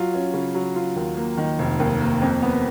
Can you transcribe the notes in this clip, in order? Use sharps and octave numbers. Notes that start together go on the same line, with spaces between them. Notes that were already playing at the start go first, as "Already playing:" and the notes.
Already playing: F#3 F4
C#4
C#3
F#3
F4
D#2
A#3
D#3
F1
D#2
A#3
F2
B3